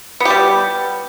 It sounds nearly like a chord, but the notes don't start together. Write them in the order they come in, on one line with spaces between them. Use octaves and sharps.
B3 G4 G3